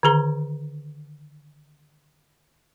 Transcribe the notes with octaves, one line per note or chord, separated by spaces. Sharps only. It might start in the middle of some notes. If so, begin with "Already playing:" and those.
D3 D#3 G#4 A#5